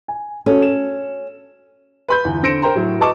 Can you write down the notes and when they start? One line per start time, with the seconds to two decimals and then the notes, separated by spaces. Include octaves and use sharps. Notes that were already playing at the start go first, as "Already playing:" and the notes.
0.08 G#5
0.46 C#4 F#4 A4
0.62 E7
2.08 B4 B5 G6
2.25 G1 E2
2.43 D3 C5 A#6 C#7 D7 E7
2.62 A#4 C5 G5 A#5 C6
2.75 A2 F#3
3.00 F#4 B4 D#5 A5 C#6 D6